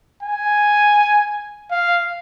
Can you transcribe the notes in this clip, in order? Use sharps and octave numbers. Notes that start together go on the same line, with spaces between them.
G#5
F5